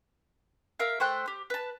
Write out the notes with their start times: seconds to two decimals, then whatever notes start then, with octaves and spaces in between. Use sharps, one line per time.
0.80 A#4 E5 F5
1.00 A3 C5 G5 F#6
1.28 G4
1.50 B4 A5